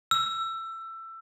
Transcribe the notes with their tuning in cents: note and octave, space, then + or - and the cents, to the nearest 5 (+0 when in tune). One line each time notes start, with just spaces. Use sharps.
E6 +20